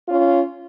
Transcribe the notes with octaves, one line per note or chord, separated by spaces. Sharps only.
C#4 F4